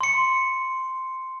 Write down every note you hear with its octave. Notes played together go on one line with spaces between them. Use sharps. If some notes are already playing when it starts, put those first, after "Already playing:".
C6 C#7